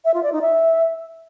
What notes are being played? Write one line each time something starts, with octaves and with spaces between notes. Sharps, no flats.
E5
F4
D5
D#4
E5